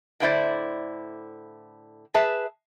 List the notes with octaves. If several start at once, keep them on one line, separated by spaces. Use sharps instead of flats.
A2 D3 A#3 E4 C5 D5
G#4 B4 E5 A5